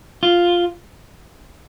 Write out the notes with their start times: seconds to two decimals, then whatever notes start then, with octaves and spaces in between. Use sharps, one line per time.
0.23 F4